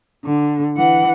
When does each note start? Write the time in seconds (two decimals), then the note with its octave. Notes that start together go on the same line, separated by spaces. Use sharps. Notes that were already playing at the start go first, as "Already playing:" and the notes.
0.24 D3
0.77 E3 F#5